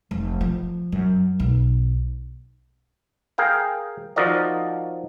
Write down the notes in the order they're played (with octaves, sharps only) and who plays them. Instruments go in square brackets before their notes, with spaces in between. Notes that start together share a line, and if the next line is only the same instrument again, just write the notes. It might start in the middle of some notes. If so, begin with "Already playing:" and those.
[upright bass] F1
F3
F#2
B1
[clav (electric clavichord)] G#4 A#4 F5 G5
F3 D#4 F#4 A#4 D5 D#5